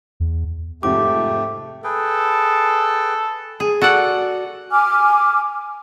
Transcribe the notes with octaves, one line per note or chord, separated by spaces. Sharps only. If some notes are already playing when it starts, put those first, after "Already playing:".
E2
F2 G#2 C3 A3 G4 D6
G#4 A4 B4 G5
G#4
F#4 A4 D5 F#5
G#5 D6 F6